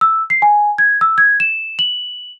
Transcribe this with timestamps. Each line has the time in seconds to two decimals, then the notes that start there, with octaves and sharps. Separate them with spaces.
0.01 E6
0.30 C7
0.42 G#5
0.78 G#6
1.01 E6
1.18 G#6
1.40 E7
1.79 F#7